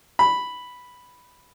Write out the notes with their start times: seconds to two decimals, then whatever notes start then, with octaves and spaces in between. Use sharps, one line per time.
0.19 B5